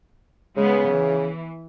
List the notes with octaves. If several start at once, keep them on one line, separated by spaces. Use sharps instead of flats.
C#3 G#3 B3
E3